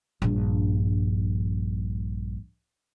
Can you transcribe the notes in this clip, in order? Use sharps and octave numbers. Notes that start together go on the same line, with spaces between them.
A#1 G2